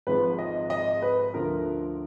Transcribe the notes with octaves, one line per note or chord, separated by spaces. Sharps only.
G#1 G#2 F3 B4
D#5
D#5
B4
D2 D3 F3 A#4